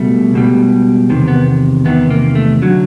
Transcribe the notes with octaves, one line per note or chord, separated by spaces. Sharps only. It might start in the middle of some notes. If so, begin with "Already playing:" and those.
Already playing: C#2 B2 G3 A3
C#2 B2 G3
E2 C3 D#3
B3
E2 C3 D#3 B3
A#3
A3
D3 F#3